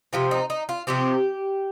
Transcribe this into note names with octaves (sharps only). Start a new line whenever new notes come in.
C3 F3 C4 F4
D#4
D#4
F4
C3 F3 C4 G4